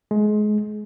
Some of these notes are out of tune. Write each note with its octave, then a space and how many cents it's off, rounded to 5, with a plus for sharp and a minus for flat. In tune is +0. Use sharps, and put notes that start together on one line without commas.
G#3 +25